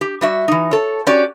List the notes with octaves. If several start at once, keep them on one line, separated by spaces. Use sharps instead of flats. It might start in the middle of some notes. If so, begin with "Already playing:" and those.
G4
G3 F#4 E5
E3 D#4
A4 C#5
C#4 F#4 G4 D5